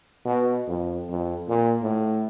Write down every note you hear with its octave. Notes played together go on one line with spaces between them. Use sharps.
B2
F2
F2
A#2
A2